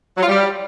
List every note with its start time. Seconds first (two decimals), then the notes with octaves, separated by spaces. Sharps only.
0.17 F#3
0.23 F4
0.28 G3